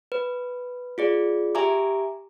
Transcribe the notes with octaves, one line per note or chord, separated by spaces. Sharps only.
B4
F4 G#4 D5
G4 E5 G#5 A#5 D6